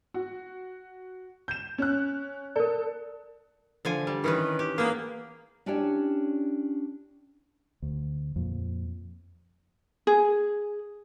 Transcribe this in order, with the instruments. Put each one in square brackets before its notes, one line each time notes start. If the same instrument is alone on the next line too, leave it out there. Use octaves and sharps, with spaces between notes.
[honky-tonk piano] F#4
G6 E7
C#4 F#6
[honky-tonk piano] A4 [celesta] A#4 D5
[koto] D3 F3 G#5
G3
[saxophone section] D#3 [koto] E3 C#4 B4
[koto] G4
[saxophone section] A#3 [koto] B3 G#4
[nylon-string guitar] C#4 D4 E4 G4 C#5 D5
[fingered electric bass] D2
F2 A#2
[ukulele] G#4